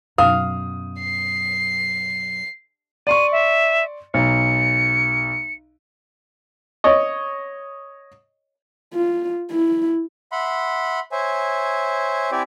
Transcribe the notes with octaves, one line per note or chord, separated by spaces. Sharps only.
F#2 B2 F5 D#6
C7
D5 C6 C#6 D#7
E5
B1 C#7
C#5 D#5
F4
E4
E5 F#5 B5 C6
C5 C#5 E5 G#5
C4 E4 G4 D5 E5 G#5